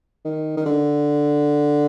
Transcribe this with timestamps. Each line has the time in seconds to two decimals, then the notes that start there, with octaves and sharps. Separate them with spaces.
0.25 D#3
0.57 D#3
0.66 D3